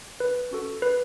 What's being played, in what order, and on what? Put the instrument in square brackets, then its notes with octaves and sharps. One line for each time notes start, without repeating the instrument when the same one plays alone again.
[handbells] B4
C#4 F#4 A4
B4